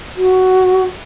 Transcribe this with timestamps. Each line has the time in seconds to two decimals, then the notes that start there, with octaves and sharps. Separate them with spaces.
0.17 F#4